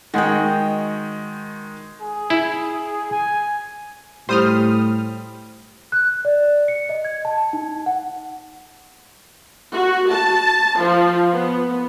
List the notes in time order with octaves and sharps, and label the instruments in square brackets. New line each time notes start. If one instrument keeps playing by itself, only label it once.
[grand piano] D#3 G#3 D#4 [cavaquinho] F#4 D#5 G5
[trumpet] G#4
[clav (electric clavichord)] E4
[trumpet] G#5
[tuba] A2 [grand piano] G3 [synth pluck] C5 D#6 F6
[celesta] F#6
D5
C#7
D#5
G#6
A5
D#4
F#5
[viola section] F#4
A5
F3
B3